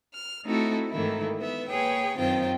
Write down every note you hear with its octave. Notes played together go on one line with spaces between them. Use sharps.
F6
A3 C4 D#4 E4 F#4 A4
G#2 D#3 E3 A3 A#3 E4
B3 E5
A#3 G#4 B4 C#5 G5
F#2 D#3 C4 F4 C5 G5